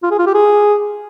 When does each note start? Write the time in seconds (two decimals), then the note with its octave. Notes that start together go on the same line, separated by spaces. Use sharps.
0.03 F4
0.11 G#4
0.19 F4
0.27 G4
0.34 G#4